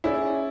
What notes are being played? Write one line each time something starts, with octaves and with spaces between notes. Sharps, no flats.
C#4 E4 G#4 D5